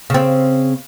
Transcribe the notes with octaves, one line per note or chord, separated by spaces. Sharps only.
C#3 C4